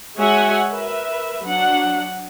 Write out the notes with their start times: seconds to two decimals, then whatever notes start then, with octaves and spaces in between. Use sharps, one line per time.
0.17 G#3 F#4 C#5 E5 F#5 G#5
0.70 A#4 B4 E5
1.43 F#3 D4 F#5